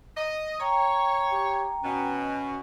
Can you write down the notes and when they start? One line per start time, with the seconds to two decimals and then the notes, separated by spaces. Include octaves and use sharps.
0.17 D#5
0.60 C#5 G5 A#5
1.32 G4
1.84 B2 C#4